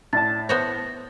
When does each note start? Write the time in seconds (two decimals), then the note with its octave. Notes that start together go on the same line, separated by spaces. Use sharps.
0.13 A2 D5 A5 A6
0.49 B3 C5 C#5 A#6